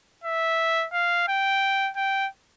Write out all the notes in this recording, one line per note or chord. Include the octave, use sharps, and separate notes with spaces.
E5
F5
G5
G5